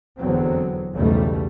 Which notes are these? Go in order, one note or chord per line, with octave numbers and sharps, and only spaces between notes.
F1 E2 D3 F#3 B3 C4
B1 E2 G#2 C#3 G3 A3